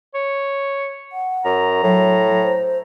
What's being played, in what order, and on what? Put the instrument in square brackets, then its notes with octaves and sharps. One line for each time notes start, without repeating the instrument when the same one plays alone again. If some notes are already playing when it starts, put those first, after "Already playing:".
[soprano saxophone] C#5
[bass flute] F#5
[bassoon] F#2 [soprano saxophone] A#5
[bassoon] A2 [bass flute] F#3
[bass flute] C5